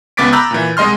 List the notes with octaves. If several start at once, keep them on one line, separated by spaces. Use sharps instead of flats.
C#2 B3 D6 A6 B6 D7
A#5 B5 D6 E6 F#6 G6
A#2 E3
C2 G#3 D#5 C6 F6